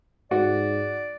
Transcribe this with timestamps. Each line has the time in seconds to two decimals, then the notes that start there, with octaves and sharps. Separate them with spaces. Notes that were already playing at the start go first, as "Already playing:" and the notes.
0.31 G#2 F#4 D5